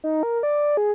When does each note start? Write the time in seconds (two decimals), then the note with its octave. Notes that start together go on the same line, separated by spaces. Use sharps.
0.04 D#4
0.23 A#4
0.43 D5
0.77 G#4